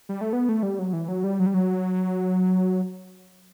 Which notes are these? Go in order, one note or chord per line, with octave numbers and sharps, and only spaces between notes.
G3
A3
B3
A3
G3
F#3
E3
F#3
G3
F#3
G3
F#3